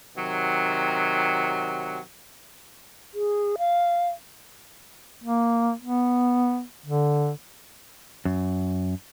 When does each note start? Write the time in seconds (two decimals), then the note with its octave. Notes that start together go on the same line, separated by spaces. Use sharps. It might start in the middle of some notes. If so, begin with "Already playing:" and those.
0.17 C3 D#3 F#3
3.14 G#4
3.58 F5
5.24 A#3
5.82 B3
6.86 D3
8.25 F#2